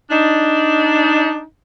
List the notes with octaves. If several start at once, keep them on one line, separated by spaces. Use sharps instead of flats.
D4 D#4